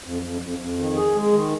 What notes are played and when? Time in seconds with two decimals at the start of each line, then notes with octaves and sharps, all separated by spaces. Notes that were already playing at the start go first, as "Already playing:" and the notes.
0.04 F2
0.22 F2
0.41 F2
0.58 F2
0.78 D#3
0.96 G#4
1.14 G#3
1.32 D#3